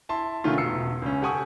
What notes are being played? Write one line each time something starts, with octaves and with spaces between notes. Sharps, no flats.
E4 A5 C6
B2 D#3 A3 C#4 E4 F4
E1 E6 C7 C#7
C#2 C#4
G4 A4 F#5 G#5 C#6 D#6